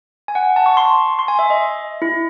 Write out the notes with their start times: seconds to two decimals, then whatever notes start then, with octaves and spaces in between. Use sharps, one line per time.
0.28 G#5
0.35 F#5
0.56 A5
0.66 C#6
0.77 C6
1.19 C6
1.28 G#5
1.39 E5
1.50 D#5
2.02 E4